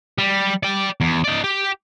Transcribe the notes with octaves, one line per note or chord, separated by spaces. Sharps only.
G3
D5 G5
E2
D#4 D5
G4